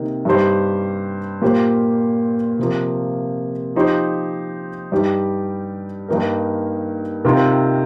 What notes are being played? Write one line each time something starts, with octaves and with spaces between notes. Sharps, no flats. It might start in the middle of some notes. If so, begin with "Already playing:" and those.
Already playing: C3 D#3 A#3
G2 G3 D#4 G4 C5
A#2 A#3 G4 C5
C3 F3 A#3
F3 D#4 G4 C5
G2 G3 D#4 G4
G2 D#3 A#3 D#4 A#4
C3 D#3 C4 F4 A#4